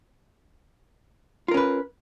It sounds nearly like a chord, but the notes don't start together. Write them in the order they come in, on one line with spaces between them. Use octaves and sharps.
F4 A#4 C#4 B4